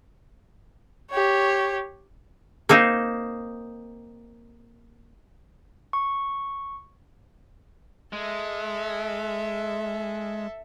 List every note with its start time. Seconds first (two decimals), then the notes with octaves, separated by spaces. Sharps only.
1.11 G4 C#5
2.69 A#3 C4 D#4
5.93 C#6
8.13 G#3 A4 E5